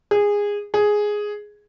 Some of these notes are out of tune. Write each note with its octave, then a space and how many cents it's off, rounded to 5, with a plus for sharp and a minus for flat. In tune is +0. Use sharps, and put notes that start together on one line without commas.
G#4 -15
G#4 +5